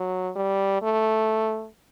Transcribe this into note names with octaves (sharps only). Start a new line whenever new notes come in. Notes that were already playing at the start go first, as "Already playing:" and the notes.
Already playing: F#3
G3
A3